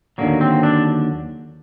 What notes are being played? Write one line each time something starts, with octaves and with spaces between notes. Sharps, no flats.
D#2 D3 F#3 A#3
C4
D4